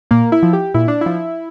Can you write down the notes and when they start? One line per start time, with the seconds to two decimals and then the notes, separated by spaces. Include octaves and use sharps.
0.11 A#2 A#3
0.32 E4
0.43 F3
0.53 G4
0.74 A#2 E4
0.88 D4
1.01 F3 E4